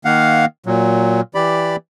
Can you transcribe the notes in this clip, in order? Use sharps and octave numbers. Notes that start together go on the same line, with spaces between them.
D#3 A#3 F5 F#5
A#2 F#3
E3 G4 D5 B5